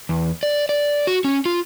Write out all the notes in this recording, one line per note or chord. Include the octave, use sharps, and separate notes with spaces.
E2
D5
D5
F#4
C#4
F4